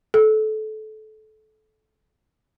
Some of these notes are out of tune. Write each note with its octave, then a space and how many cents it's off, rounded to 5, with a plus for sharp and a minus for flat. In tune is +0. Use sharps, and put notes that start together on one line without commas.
A4 -25